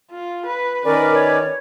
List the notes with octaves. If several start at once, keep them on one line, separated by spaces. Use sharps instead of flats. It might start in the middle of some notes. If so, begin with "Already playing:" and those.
F4
B4
D#3 C#4 A#4 B4 D5
C#5